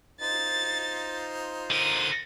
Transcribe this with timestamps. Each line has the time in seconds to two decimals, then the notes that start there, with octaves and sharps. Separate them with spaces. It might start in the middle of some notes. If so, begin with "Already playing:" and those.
0.20 D#4 F4 C5 A6
1.71 D3 A#4 D#7